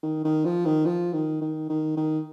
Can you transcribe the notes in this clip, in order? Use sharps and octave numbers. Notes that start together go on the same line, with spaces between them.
D#3
D#3
F3
D#3
F3
D#3
D#3
D#3
D#3